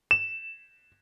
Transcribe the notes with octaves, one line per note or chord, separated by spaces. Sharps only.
E7